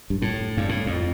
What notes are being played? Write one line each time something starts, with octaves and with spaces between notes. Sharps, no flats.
G2
A2
G2
A2
F2